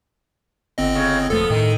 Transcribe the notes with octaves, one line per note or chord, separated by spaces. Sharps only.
G1 C4 D#5
C#3
E1 F3 A3 B3 A4
A2 D#3